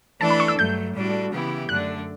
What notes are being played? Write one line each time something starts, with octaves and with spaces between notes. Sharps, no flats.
E3 A3 D4 A4 A5
B5
C#6
E6
G2 F#3 A3 G6
A2 G3 D4 F#4 A4
C#3 E3 B3 E4 G4
F#2 D3 A3 D4 F#6